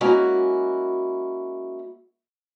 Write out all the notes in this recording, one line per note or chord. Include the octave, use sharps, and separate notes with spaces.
G#3 A#3 C#4 E4 F#4